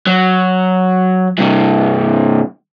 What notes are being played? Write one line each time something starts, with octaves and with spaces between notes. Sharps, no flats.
F#3
G2 C3